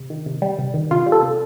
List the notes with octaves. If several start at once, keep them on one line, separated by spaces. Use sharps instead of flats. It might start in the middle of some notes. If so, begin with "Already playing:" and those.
Already playing: C3
D#3
C3
G3
C3
D#3
C3 F4
G3
A4
C3